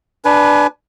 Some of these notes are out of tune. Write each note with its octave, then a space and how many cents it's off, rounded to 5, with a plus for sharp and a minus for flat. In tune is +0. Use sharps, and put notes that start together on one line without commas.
D4 +5 B4 +0 G#5 +30